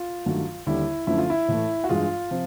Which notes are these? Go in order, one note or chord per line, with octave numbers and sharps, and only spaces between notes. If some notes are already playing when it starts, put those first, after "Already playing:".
Already playing: F4
G2 D#3 F#3 A3
D#2 D3 G3 E4
F#2 D3 F3 A3 E4
F4
E4
A2 E3 A3
F#4
G2 E3 G#3 F4
C3 F3